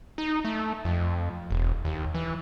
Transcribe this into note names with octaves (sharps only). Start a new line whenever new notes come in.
D#4
A3
F2
E1
D#2
E3